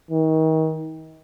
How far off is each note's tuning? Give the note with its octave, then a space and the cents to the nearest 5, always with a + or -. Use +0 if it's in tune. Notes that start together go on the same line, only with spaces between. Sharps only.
D#3 +35